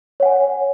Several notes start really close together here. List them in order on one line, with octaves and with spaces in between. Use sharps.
C#5 F#5 G#5